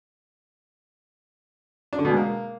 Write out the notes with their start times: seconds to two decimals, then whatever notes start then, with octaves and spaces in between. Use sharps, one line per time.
1.93 D4
1.99 D3
2.05 B2
2.11 G#3
2.17 A#3